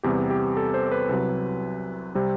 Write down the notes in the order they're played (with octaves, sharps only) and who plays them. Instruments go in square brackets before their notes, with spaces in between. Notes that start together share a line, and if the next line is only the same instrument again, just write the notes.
[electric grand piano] E2 C3 G3 B3 G4
G4
A4
C5
B4
C2 C3 F#3
C3 G3 C4